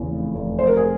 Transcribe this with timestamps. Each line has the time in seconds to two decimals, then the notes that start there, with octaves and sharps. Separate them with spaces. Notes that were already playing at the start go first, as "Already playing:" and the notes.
Already playing: E2 C#3
0.10 F1
0.35 F1
0.59 F1 C5
0.67 A#4
0.76 G#4